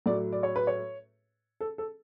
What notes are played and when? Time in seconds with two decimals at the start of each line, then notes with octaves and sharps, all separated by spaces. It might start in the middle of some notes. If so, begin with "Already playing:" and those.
0.06 A2 F#3 D5
0.33 D5
0.43 C#5
0.56 B4
0.67 C#5
1.60 A4
1.78 A4